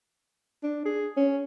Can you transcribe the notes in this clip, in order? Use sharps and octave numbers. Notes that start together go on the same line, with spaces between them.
D4
G#4
C#4